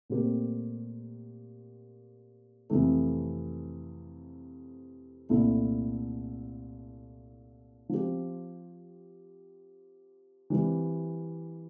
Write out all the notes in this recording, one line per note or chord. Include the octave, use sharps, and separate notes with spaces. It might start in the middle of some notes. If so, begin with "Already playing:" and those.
A#2 A3 C4 G4 A#4
F2 C3 E3 A3
C2 A#2 A3 E4 A4
F3 C4 G4
E3 G3 C4